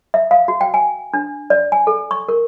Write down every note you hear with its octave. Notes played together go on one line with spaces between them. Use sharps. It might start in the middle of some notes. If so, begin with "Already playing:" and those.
E5
F5
F#4
G5
G#5
D4
D5
G#5
A4
C#6
A#4